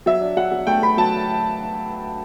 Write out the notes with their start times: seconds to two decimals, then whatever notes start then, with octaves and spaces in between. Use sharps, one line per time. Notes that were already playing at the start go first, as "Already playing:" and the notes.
0.06 F#3 E5
0.21 D4
0.37 F#3 F#5
0.52 F#3
0.67 A3 G5
0.82 A3 B5
0.97 F#3 A5